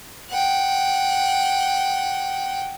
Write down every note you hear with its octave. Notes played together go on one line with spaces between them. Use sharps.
F#5 G5